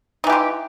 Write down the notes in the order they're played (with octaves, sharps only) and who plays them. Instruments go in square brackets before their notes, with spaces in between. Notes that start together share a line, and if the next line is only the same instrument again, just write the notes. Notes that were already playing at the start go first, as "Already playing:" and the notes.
[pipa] D#4
E3
G4
F4